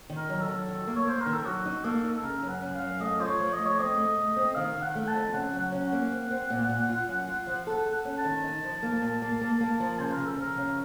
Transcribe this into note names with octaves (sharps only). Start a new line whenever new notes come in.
D#3
A#4
F#3
A4
F#3
D#3
A#3
C#5
A#3 C5
A#4
D#3
A4
F#3 F#4
D#4
A#3 A4
D#4
A4
C#3 A#4
F#2
F#5
F#2
F5
F#2
A3 D#5
F4 C5
C#5
F3
D#5
A3
C#5
C4 D#5
A3
A3
C4
D#3 F5
D#3
F#5
A3
A5
F2
C#3 F#5
F#3
F#5
C#4
F#5
A#3
C4
C4
A#2
A#2
F4
F#2
F4
F3
A4 F#5
A4
F#5
C#4
A5
D#3
D#4
F3
A#3
A#2
A#3
A#3
A#3
F3
C#3 C5
A#4
C#3
A4
F3 A#4
C#3